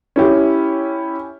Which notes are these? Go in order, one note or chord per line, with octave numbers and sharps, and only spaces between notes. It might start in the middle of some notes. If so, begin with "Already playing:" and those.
C#4 E4 G4